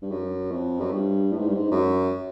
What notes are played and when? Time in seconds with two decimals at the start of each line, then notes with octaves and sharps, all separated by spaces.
0.02 G2
0.11 F#2
0.51 F2
0.80 F#2
0.92 G2
1.32 A2
1.39 G#2
1.47 G2
1.55 G#2
1.71 F#2